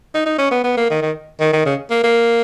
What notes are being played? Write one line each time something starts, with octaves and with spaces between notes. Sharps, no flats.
D#4
D#4
C#4
B3
B3
A#3
D#3
D#3
D#3
D#3
C#3
A#3
A#3